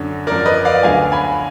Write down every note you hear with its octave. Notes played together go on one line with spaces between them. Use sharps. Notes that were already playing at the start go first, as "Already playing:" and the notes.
Already playing: F#2 D3 F#3
F#2 F3 A#4 D5
B4 D#5
D5 F5
D2 D3 F#3 F5 G#5
G#5 B5